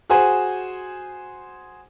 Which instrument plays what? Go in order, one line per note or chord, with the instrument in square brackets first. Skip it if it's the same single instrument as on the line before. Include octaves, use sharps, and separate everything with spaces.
[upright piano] F#4 G#4 C5 G#5